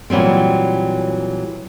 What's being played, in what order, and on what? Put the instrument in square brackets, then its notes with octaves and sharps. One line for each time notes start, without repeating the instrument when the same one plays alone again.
[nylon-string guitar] A#2 E3 F#3 G3 C4